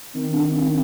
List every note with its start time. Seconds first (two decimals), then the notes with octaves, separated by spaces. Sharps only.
0.14 D#3 C4
0.30 D4
0.46 C4
0.61 C4